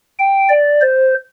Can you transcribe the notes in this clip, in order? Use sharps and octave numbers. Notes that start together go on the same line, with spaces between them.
G5
D5
C5